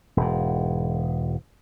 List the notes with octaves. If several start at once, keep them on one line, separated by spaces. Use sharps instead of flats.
E1 G#2